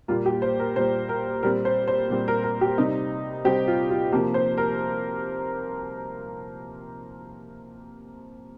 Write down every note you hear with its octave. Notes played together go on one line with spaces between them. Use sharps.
A#2 G3 A#3 F4
G4
C5
A#4
A#2 G3 A#3 C5
A#4
A#2 G3 C4 A#4
C5
C5
A#2 G3 C4
A#4
A#4
G4
C3 G3 C4 D#4
C3 G3 C4 G4
F4
F4
C3 F3 A#3 G4
C5
A#4